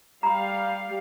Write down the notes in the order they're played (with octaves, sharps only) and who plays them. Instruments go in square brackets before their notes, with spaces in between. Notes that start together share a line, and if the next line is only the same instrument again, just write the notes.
[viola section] G3 F5 [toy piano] A#5 B5